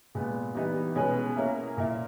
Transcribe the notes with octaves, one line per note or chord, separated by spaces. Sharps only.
A#2 G#3 B3
E3 G3 B3 D#4
B2 G#3 C#4 G#4 B4
A#3 C#4 E4 A#4
A#2 A#3 E4